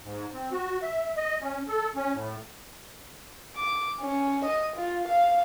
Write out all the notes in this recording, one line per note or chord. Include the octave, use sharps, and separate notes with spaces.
G#2
C4
F#4
E5
D#5
C#4
A4
C#4
A2
D6
C#4
D#5
F4
F5